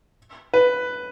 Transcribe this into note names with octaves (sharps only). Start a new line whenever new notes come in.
B4